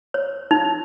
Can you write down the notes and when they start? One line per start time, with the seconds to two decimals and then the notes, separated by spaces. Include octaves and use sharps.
0.14 C#5
0.51 D#4